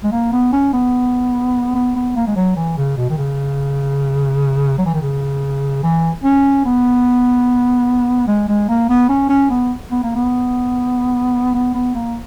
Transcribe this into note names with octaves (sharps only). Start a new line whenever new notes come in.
G#3
A#3
B3
C#4
B3
B3
B3
A#3
G#3
F#3
E3
C#3
B2
D#3
C#3
F#3
E3
D#3
C#3
E3
C#4
B3
G#3
G#3
A#3
B3
C#4
C#4
B3
B3
A#3
B3
B3
B3
A#3